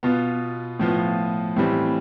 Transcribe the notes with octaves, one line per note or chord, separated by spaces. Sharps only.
B2 B3 F4
A2 F3 B3 F4
A2 E3 G3 C4